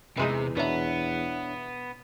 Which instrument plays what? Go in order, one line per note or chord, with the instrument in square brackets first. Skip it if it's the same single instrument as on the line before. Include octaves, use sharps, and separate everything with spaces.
[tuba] E2 [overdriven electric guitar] C3 [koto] E3 G#3 D#4
[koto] B2 A#5 [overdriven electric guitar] B3 [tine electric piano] D4 C#5 E5